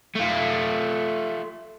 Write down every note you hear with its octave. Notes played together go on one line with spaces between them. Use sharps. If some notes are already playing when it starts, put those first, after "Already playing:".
A3 F4